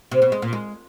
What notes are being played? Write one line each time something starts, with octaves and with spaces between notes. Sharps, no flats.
C3
B2
G#3
A#2
G#3